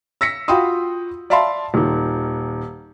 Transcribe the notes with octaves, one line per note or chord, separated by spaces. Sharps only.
E6 A#6 B6 C#7
F4 F#4 G5 B5 C6 D#6
D5 E5 F5 A5 B5 C6
D#1 D#3